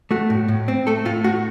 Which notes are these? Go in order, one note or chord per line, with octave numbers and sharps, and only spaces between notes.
A3 F#4
A2
A2
C4
A3 A4
A2 F4
A2 F#4